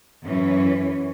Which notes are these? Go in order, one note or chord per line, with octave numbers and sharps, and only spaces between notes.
F#2 E3 C#4 C#5